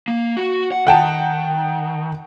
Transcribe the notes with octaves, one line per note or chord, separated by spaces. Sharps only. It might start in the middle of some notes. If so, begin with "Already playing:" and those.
A#3
F#4
F#5
D#3 F#5 G5 A5